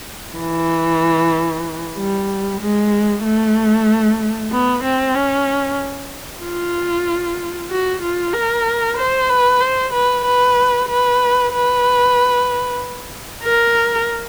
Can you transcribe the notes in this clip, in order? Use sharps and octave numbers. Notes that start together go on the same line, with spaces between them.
E3
G3
G#3
A3
B3
C4
C#4
F4
F#4
F4
A#4
C5
B4
C5
B4
B4
B4
B4
A#4